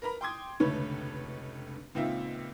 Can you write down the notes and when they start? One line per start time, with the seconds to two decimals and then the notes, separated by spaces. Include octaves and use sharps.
0.02 A#4 B4 A#5 B5
0.21 G5 C6 D6 D#6 G#6
0.60 F1 C#2 D3 A3 B4 C#5
1.95 C#2 A#2 C4 D#4 F4 E5